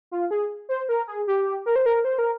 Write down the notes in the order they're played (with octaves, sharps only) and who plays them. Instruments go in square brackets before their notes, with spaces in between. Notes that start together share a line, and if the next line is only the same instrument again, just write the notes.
[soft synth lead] F4
G#4
C5
A#4
G#4
G4
A#4
C5
A#4
C5
A#4